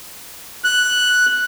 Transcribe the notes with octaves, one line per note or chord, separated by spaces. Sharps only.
F#6